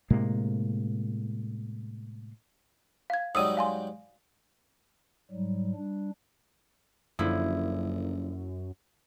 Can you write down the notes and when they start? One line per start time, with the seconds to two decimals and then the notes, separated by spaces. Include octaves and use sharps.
0.10 A2 C3 G#3 A#3
3.10 F5 G#6
3.35 G#2 F#3 G3 D#6 E6 D#7
3.57 F5 G#5 C6
5.31 G#2 F#3 G3
5.76 G3 D4
7.19 F#1 F#2 D3 F3 E4